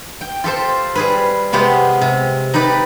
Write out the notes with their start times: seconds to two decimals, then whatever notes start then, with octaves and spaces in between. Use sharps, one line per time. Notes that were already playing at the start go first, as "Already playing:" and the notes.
0.21 G5
0.44 F4 G4 A4 C5
0.95 G3 G#4 B4
1.52 C3 G#3 B3 G4 F5 F#5
2.01 C3
2.54 D#4 G4 B4 D5